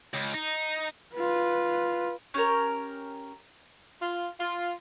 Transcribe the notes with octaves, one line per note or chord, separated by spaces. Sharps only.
C#2
D#4
F4 B4
C#4 G4 A#4
F4
F4